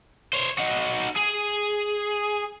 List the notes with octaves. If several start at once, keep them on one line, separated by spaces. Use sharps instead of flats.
C5 C#5
D#4 F#4
G#4